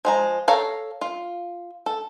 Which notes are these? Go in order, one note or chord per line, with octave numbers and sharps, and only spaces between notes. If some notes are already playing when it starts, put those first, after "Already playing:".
F3 G#3 A#5
A4 C#5 F5 A#5
F4
A4